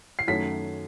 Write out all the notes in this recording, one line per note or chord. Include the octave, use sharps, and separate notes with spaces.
C7
F#2 D#3 F#3 A3 B6